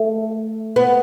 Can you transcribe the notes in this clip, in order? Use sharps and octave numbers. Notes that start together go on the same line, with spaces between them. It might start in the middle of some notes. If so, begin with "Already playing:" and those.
Already playing: A3
B3